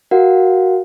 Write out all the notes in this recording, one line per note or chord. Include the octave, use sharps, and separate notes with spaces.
F#4 A#4 F5 F#5